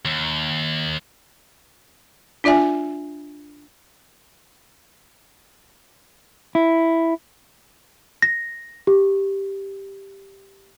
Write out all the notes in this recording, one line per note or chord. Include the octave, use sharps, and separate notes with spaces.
D#2
D4 F4 D5 E5 G#5
E4
A#6
G4